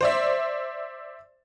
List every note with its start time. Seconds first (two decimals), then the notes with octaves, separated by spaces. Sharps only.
0.01 C5 D5 E5